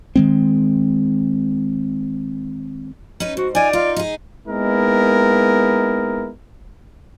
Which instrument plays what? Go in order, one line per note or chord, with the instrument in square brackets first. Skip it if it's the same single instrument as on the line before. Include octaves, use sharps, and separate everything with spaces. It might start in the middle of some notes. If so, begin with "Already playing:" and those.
[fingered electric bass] D#3 G#3 C4
[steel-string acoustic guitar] C#4 D#4 B4
[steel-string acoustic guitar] G#2 [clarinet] F#4
[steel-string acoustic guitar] D#4 F4 [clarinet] D5 [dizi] G#5
[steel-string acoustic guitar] D#4 [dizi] F4
[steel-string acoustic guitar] D#4 G#4
[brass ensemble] G#3 A#3 B3 D#4 E4 A#4